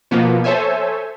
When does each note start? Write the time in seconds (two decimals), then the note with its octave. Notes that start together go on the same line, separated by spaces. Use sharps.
0.11 B2 F3 A#3 B3
0.44 A4 C5 C#5 E5 G#5